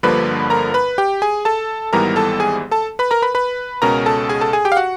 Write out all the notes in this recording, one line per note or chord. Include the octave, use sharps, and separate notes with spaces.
G1 G2 D3 F3 A#3 B4 B5
A#4 A#5
B4 B5
G4 G5
G#4 G#5
A4 A5
G#1 G#2 E3 G3 B3 A#4 A#5
A4 A5
G#4 G#5
A4 A5
B4 B5
A#4 A#5
B4 B5
B4 B5
C#2 B2 G#3 C#4 A#4 A#5
A4 A5
G#4 G#5
A4 A5
G#4 G#5
G4 G5
F5
F#4 F#5